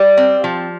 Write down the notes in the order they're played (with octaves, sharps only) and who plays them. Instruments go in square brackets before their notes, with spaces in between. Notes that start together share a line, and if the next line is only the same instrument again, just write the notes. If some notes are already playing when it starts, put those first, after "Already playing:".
Already playing: [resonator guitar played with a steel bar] G3
C4
F3